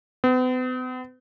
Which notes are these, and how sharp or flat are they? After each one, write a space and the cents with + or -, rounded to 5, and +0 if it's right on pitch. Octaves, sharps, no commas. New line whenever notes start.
B3 +45